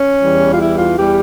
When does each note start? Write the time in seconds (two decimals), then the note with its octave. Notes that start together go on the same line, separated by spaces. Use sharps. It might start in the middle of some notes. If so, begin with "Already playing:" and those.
Already playing: C#4
0.22 E2 E3 G3
0.52 F4
0.60 E4
0.77 F4
0.97 E2 E3 G3 G4